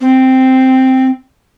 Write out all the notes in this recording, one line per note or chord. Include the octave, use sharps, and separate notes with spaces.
C4